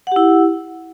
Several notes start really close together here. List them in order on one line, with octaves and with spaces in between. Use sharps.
F#5 G4 E4